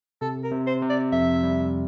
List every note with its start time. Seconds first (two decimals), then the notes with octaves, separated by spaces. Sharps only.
0.21 C3 A4
0.44 A#4
0.52 C3
0.67 C5
0.82 C3
0.90 D5
1.12 F2 E5
1.43 G3